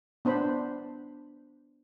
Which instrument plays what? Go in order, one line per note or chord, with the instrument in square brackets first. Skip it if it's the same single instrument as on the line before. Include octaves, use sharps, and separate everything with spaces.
[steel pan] B3 D4 C5 B5